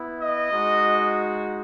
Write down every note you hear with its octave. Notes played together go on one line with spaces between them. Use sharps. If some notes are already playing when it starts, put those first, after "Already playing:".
Already playing: B3 E4
D#5
G#3 D#4 F#4